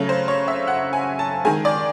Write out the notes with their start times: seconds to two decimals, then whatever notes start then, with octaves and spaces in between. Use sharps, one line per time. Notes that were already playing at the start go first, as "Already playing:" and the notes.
Already playing: C#3 F#3 A3
0.09 C5
0.28 C#5
0.48 E5
0.67 F#5
0.93 G#5
1.19 A5
1.45 D#3 G#3 G#5
1.65 D5